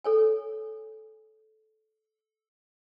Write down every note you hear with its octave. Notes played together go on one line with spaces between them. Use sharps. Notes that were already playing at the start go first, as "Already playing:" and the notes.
A4 C#5 G#5